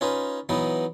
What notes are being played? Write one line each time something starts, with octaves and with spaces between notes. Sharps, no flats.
C#4 D#4 F4 B4
E3 F#3 B3 D#4